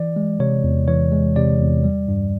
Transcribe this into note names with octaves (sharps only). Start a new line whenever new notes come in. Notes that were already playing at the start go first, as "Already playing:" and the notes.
Already playing: E3 D5
G#3
C3 C#5
E2
E3 C#5
G#3
C3 D5
E2
G3
G2